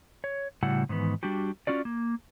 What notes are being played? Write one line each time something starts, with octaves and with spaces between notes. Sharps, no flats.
C#5
A2 C#3 G3 E4 F#4 F#5
G#2 D#3 E3 B3
G3 D4 F#4 G4
C#4 F4 F#4 D5
A#3